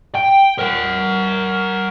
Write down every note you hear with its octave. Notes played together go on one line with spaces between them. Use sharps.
G5
A#4 F#5